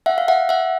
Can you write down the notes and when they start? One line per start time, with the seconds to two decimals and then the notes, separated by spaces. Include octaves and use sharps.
0.06 E5 F#5
0.18 F5
0.28 E5 F#5
0.49 E5 F#5